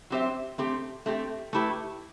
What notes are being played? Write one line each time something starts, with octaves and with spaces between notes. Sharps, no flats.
F#3 C4 G4 C5 E5
A3 C4 G4
A3 C4 G4
A3 E4 G4 B4